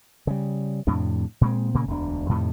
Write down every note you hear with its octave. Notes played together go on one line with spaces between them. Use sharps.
C#3 G3
F2 A2 C3 D4
A#2 G#3 C4
A#2 C#3 A#3
E1 D2 D4
F2 A2 C3 D#3